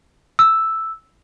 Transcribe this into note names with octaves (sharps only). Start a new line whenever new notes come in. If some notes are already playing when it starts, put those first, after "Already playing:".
E6